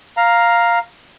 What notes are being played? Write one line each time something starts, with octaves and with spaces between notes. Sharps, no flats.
F5 A#5